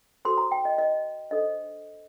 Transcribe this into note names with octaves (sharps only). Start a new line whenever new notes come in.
F#4 A4 C5 C6
A#5
G5
D#5
D#5
D4 A4 C5 D#5